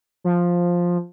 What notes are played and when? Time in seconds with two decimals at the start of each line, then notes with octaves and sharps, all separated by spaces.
0.24 F3